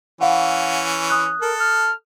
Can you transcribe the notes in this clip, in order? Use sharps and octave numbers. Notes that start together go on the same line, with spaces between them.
E3 C#4 F5 F#5
D#6 F#6
A4 A#4
F6